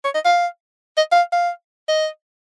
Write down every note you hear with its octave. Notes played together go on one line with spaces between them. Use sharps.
C#5
D#5
F5
D#5
F5
F5
D#5